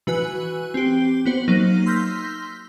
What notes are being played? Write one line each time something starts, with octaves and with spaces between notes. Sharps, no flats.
E3 F#4 B4 G#5 F#6
C4 G4
B3 F#4 C5
F#3 A#3 D#4
C6 E6 F6 G6 A#6 B6